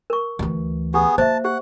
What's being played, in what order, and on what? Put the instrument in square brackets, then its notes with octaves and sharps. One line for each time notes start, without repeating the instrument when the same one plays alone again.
[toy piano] A#4 C#6
[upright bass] D2 E3
[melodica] B3 G#4 [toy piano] G4
[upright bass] A#3 [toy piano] C5 E5 [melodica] A5
[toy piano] G4 [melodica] F#5